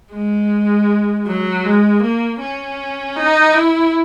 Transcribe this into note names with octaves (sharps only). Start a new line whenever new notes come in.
G#3
F#3
G#3
A#3
C#4
D#4
E4